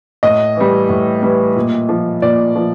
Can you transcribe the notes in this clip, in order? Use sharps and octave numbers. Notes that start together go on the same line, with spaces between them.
A2 D#5
E3 G3
A2
E3 G3
A#2
F3
A#2 D5
F3